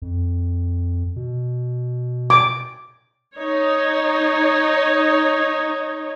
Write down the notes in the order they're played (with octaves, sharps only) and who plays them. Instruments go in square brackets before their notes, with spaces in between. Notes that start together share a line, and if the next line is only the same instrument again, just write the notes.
[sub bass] F2
B2
[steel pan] D6
[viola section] D#4 C#5